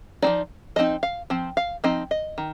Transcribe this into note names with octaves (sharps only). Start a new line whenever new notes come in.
F3 C4 D#4 D5
F3 C4 D#4 D#5
F5
F3 C4
F5
F3 C4 D#4 D#5
D#5
D#3